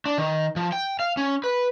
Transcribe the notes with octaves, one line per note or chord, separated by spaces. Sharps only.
D4
D#3
F3
G5
F5
C#4
B4